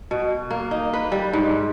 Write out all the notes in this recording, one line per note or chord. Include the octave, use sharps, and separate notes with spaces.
B2
A#3
D#4
B4
G3
G#2